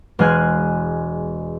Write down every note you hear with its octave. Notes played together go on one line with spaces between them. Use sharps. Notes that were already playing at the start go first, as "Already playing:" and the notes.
E1 G#3 G#5 F6 F#6 G#6